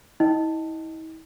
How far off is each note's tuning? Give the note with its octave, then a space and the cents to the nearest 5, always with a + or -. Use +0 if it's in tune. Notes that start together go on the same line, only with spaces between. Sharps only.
E4 -40 D#5 +0 G5 +0